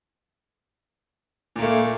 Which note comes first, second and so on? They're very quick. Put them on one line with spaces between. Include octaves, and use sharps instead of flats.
A#2 A#3 A3